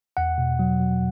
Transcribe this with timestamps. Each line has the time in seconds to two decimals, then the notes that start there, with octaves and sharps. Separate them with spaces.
0.17 E2 F#5
0.38 B2
0.59 F#3
0.79 F#3